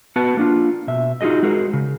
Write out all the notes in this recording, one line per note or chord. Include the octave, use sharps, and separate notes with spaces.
B3 F#4 B4 F#5 A5
A#3 D4 F4
B2 E5
D#4 F4 F#4 G#4 D#5
G#3 F#4 G#4 A#4 C5
C#3